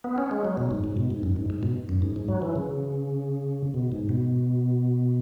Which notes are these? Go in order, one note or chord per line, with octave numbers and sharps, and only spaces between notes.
B3
C#4
G#3
F#3
B2
G#2
G#2
B2
G#2
F#2
G#2
G#2
B2
F#2
G#2
G#2
F#3
E3
C#3
B2
G#2
B2